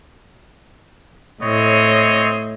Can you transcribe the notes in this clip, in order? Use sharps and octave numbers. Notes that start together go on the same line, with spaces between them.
A2 C4 C#5 D#5